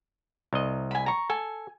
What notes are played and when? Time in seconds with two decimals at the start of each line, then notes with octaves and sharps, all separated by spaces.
0.53 C2 D#5
0.91 G#5 B5
1.06 A#5 C#6
1.30 A4 G#5